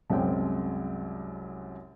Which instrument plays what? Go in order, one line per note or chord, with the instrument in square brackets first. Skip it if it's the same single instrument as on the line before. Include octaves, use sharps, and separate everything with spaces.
[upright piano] C2 F#2 G#3 C4 G5